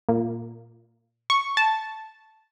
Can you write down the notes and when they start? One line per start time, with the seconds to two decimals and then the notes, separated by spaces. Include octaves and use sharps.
0.09 A#2
1.30 C#6
1.57 A5